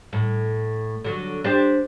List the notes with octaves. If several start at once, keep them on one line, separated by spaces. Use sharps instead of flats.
A2
D3 F#3
D4 G4 C5